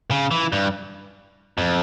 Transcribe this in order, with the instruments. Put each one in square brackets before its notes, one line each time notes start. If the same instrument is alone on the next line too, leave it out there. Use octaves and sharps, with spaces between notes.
[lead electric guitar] C#3
E3
G2
F2